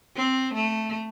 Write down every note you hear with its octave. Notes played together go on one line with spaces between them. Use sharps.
C4
A3